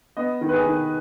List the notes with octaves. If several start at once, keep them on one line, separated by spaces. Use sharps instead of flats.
B3 D#5
D#3
B4
G#4
D#3